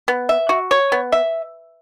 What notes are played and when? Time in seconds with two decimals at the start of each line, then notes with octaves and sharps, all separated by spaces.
0.08 B3
0.29 E5
0.49 F#4
0.71 C#5
0.92 B3
1.12 E5